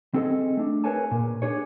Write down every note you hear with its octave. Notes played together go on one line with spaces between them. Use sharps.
C4 G#4 A4 D#5
A3 D4
G#4 A#4 B4 C#5 G#5 A5
A#2
D4 G#4 C#5